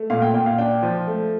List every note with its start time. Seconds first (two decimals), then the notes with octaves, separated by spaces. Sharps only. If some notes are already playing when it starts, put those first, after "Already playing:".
Already playing: A3
0.10 A#2 F5
0.22 G5
0.34 A#2 G5
0.46 F5
0.58 D4 G5
0.83 F3
1.07 A3